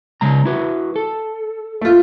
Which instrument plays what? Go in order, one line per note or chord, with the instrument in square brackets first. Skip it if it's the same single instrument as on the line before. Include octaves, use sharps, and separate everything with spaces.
[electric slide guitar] C#3 G#3 A#5
E4 F#4 B4
A4
[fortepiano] A3 F4